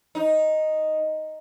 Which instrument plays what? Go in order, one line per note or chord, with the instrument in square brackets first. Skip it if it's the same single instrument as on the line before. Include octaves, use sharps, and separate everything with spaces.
[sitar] D#4